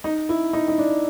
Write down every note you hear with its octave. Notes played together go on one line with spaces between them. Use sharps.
D#4
E4
D#4
D#4
D4